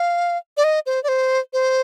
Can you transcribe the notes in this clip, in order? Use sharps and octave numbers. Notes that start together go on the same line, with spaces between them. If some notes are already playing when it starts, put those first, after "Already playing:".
Already playing: F5
D5
D#5
C5
D5
C5
C5